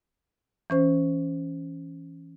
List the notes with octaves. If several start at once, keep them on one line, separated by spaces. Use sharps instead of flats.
E3 C#4 C5